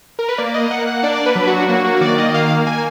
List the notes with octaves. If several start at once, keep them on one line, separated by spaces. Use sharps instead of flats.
A#4
B4
A#3 D5
D#5
A#3 F#5
F#5
D4 D5
B4
F#3
F#4
A#3 F#4
F#4
D#3 D5
D#5
A#3 F5
A#3 G#5